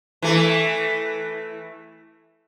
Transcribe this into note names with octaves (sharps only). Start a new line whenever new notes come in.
E3 A3